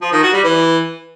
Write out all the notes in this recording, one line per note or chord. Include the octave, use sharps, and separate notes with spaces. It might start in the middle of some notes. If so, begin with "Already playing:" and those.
F3
D#3
F#4
G3
E3